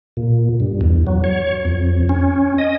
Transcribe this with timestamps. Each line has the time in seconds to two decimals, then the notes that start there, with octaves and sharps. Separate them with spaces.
0.17 A#2
0.60 G2
0.81 E2
1.07 F#3
1.24 C#5
1.65 F2
2.09 C#4
2.58 D#5